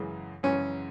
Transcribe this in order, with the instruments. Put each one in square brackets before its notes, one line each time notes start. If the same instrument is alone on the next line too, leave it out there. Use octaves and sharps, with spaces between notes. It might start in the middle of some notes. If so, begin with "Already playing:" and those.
Already playing: [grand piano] F#2 C#3 E3 G#3
[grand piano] F#2 C#3 E3 G#3 [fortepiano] C#4